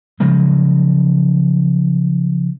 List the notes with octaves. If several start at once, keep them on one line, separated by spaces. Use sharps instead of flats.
C#3 F3 F#3 G#3